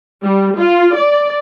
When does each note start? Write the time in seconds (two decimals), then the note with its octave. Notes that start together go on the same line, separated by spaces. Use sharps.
0.23 G3
0.58 F4
0.95 D5